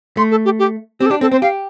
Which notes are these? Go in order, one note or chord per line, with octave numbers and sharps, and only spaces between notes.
A3 C6
A4
G4
G4
C4 G4
A4
D4 G4
C4 A4
C4 C5
G4 F5